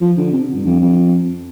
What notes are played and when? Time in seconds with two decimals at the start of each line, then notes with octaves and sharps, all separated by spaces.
0.01 F3
0.17 D3
0.33 C3
0.55 G2
0.66 F2
0.81 F2